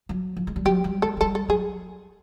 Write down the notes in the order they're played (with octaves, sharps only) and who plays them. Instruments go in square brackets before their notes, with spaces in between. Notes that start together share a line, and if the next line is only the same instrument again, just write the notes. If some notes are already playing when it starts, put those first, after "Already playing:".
[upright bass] F#3
F3
G#3
G3
[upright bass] F#3 [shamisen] G4
[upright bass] G3
[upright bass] G#3 [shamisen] A4
[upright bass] F#3
[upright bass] G3 [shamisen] A4
[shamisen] A4
[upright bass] F#3 [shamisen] G#4